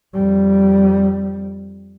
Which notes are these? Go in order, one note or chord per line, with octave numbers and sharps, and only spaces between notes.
F2 G3